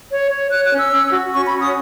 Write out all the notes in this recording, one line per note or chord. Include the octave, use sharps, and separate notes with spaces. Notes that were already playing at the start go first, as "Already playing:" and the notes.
C#5
C#5
C#5 F#6
F#6
C#4
E6
C#4
F#4
C#4 C#6
B5
F#4
D#6